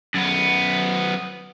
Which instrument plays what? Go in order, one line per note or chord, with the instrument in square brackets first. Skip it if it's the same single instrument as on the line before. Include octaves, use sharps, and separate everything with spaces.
[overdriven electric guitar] F#2 B3